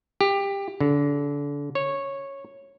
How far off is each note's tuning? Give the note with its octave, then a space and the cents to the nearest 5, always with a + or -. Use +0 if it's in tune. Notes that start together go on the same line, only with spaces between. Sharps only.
G4 +20
D3 -30
C#5 -10